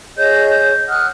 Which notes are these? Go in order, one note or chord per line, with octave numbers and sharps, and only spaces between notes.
G#4 C#5 D#5 G6
F#5 D#6 F6 F#6